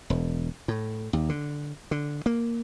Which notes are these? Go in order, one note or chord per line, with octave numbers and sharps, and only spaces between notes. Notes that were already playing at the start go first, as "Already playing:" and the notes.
E1
A2
D#2
D3
D3
A#3